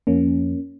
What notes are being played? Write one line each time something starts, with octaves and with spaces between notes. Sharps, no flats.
F2 F3 A#3 C#4